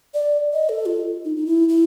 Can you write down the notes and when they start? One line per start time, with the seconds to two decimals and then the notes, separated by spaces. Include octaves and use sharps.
0.14 D5
0.53 D#5
0.69 A4
0.86 F4
1.25 D#4
1.36 D#4
1.46 E4
1.69 E4